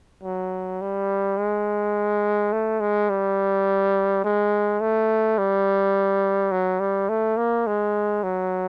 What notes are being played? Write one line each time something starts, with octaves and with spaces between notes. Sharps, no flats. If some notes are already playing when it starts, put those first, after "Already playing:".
F#3
G3
G#3
A3
G#3
G3
G#3
A3
G3
F#3
G3
A3
A#3
G#3
F#3